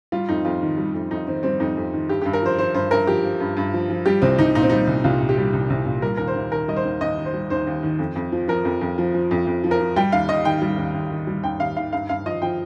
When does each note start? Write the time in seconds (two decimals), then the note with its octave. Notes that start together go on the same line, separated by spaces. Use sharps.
0.12 G3 F4
0.29 F2 D#4
0.45 F2 F4
0.62 D#3
0.78 G3
0.94 F2
1.11 F2 D#4
1.27 D#3 C4
1.43 G3 C4
1.59 F2 D#4
1.77 F2
1.93 D#3
2.09 G2 G4
2.22 G4
2.25 G2
2.33 A#4
2.42 F3 C5
2.58 F3 C5
2.74 G2 C5
2.91 G2 A#4
3.07 F3 G4
3.24 F3
3.40 G2
3.57 G2
3.74 F3
3.90 F3
4.06 G3 G4
4.22 C2 C4
4.39 C2 D#4
4.55 A#2 D#4
4.62 C4
4.70 G3 D#4
4.87 C2
5.04 C2 F4
5.21 A#2
5.29 G4
5.37 G3
5.53 C2
5.70 C2
5.86 A#2
6.02 G3 A#4
6.17 D#2 A#4
6.27 C5
6.35 D#2
6.52 D#3 A#4
6.68 G3 D#5
6.76 C5
6.85 D#2
7.01 D#2 D#5
7.18 D#3
7.25 C5
7.34 G3
7.50 D#2 C5
7.67 D#2
7.83 D#3
7.99 F2
8.16 F2
8.32 F3
8.48 F3 A#4
8.65 F2
8.81 F2
8.98 F3
9.14 F3
9.31 F2
9.47 F2
9.64 F3
9.71 A#4
9.80 F3
9.96 G3 G5
10.12 D#2 F5
10.29 D#2 D#5
10.45 D#3 G5
10.62 G3
10.78 D#2
10.94 D#2
11.11 D#3
11.27 G3
11.43 D#2 G5
11.60 D#2 F5
11.76 D#3 F5
11.93 G2 F5
12.09 G2 F5
12.26 F3 D#5
12.42 F3 G5